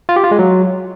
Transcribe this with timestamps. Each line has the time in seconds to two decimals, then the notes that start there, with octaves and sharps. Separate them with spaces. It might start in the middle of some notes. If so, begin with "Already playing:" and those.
0.09 F4
0.16 G4
0.24 F4
0.31 G#3
0.39 F#3